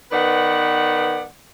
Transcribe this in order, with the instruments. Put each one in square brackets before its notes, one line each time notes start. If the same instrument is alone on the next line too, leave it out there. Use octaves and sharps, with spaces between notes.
[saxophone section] D#3 B3 B4 D5 F#5